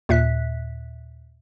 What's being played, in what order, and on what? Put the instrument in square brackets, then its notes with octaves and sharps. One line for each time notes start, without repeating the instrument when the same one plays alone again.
[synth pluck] D#2 A#2 E5 F#6 B6